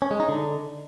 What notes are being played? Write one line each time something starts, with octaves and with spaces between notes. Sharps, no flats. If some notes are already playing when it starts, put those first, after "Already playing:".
C#4
G#3
D#4
D3